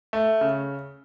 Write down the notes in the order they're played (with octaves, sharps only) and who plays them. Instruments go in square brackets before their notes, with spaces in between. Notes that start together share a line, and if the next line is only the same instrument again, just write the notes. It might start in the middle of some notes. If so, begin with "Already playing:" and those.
[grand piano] A3
C#3